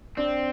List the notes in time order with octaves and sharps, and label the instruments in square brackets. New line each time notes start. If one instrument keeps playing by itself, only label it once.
[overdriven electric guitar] C4 [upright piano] D4